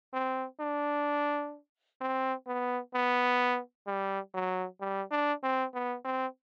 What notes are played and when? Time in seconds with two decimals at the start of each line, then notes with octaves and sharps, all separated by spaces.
0.13 C4
0.60 D4
2.01 C4
2.47 B3
2.94 B3
3.87 G3
4.34 F#3
4.81 G3
5.11 D4
5.43 C4
5.74 B3
6.05 C4